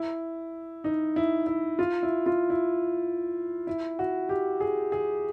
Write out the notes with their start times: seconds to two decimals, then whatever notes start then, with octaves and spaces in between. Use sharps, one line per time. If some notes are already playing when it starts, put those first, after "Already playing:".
Already playing: E4
0.84 D#4
1.16 E4
1.47 E4
1.79 F4
2.03 E4
2.26 F4
2.50 E4
3.67 E4
3.99 F#4
4.29 G4
4.61 G#4
4.92 G#4